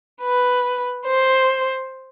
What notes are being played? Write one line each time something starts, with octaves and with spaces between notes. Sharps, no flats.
B4
C5